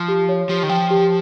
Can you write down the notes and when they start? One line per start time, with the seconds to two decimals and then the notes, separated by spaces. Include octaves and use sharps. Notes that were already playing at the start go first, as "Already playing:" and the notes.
Already playing: F3
0.08 G4
0.29 C#5
0.49 F3 G4
0.63 D#3
0.69 F3 G5
0.90 G4